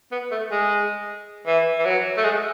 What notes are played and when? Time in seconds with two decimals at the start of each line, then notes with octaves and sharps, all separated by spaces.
0.12 B3
0.32 A3
0.51 G#3
1.47 E3
1.79 E3
1.85 F#3
2.17 A3
2.24 G#3